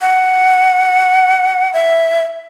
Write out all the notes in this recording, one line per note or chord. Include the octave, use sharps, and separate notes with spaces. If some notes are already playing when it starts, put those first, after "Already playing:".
F#5
E5